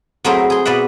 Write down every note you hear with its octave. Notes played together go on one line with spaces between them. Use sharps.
F#3 A3 C4 E4 G#4 A#4
G#4 C6
B2 B4 D5 E5 F#5